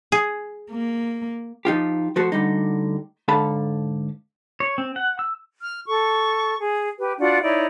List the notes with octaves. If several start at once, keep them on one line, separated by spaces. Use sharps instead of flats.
G#4
A#3
F3 D#4 F4 G4
F3 A3 F#4 A4 C5
D2 D3 G3 D#4
G#2 D3 A4 F5 A5 B5
C#5
C4
F#5
E6
F6
A4 C#6
G#4
G4 B4
D4 F4 F#4 F#5
D#4 E4 C#5 D5